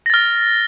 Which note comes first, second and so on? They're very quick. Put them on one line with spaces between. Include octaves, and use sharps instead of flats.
A#6 A6 F6